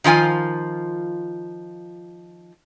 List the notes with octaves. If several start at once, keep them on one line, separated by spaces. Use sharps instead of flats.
D#3 F3 F4 G#5